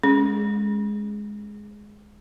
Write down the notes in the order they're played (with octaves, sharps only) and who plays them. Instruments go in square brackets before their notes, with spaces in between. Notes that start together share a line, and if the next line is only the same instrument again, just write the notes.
[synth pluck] G#3 [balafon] C#4